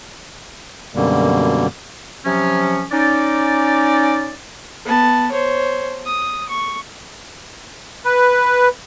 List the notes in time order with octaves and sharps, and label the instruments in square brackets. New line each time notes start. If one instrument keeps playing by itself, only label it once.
[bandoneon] F#2 B2 D3 G3 A#3
[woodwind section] C3 F3 F#3 C#4
C#4 D#4 D5
[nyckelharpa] B3 A5
C5 C#5
D#6
C#6
[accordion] B4